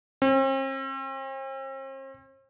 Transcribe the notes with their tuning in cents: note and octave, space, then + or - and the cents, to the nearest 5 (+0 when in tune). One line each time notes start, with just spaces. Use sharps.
C4 +45